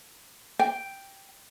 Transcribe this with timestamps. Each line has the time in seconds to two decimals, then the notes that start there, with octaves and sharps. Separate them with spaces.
0.59 G5